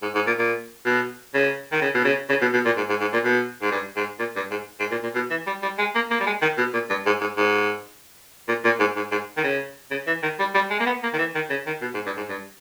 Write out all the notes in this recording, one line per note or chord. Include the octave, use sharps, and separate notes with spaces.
G#2
G#2
A#2
A#2
B2
C#3
D#3
C#3
B2
C#3
C#3
B2
B2
A#2
G#2
G#2
G#2
A#2
B2
G#2
G2
G#2
A#2
G2
G#2
G#2
A#2
A#2
B2
E3
G3
G3
G#3
A#3
A#3
G3
G#3
D#3
B2
A#2
G2
G#2
G#2
G#2
A#2
A#2
G#2
G#2
G#2
D#3
C#3
C#3
E3
D#3
G3
G3
G#3
A#3
B3
A#3
D#3
E3
D#3
C#3
D#3
B2
G#2
G2
G#2
G2